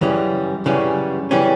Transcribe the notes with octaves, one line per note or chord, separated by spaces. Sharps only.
F#2 C#3 E3 G3 C#4
F#2 C#3 E3 G3 C#4
C#3 E3 G3 C#4